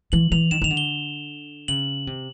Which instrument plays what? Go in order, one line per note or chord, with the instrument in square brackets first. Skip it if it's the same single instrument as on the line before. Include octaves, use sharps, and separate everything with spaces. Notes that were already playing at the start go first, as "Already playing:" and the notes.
[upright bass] E3 [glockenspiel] F#7
[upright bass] E3 [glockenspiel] F7
[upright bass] D#3 [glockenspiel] E7
[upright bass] D#3 [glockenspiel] F7
[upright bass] D3
[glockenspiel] G7
[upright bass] C#3 [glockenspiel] F#7
[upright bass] C3